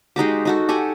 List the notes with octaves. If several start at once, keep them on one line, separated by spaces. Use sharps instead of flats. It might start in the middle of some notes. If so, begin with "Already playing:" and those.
G#3 D#4 F#4 G4
D#4 F#4 A4
G4 A4 F#5 G#5